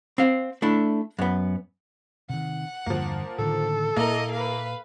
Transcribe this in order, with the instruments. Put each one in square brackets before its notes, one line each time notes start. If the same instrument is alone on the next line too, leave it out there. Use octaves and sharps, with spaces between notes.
[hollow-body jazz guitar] C4 F5
A3 D4 E4
F#2 B3
[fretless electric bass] C3 D#3 [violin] F#5
[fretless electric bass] E2 G2 D3 [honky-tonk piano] F3 A#3
[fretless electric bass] A2 D3 D#3 [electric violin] A4
[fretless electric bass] A#2 [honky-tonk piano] A#3 E4 A#4 [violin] D#5
[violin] B4 F5